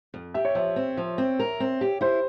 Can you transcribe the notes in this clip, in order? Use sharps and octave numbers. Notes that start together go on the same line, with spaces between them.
F2
G4 E5
C#5
F3 E5
C4
F3
C4
A#4
C4
G4
E4 C5